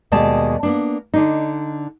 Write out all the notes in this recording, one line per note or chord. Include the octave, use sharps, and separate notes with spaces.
D#2 B2 G#3 D5 A5
A#3 B3 D4
D3 D4 D#4